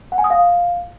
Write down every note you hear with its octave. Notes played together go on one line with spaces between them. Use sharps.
F#5
G#5
D#6
F5